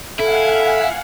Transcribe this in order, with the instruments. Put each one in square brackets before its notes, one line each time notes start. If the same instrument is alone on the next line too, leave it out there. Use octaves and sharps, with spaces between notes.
[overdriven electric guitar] E4 [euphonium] A4 [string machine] F5 F#5 G#5